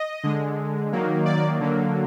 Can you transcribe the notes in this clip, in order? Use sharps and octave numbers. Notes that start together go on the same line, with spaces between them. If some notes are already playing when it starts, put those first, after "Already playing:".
Already playing: D#5
D3 G#3
D#3 F#3 A#3
D5
D3 F#3 A#3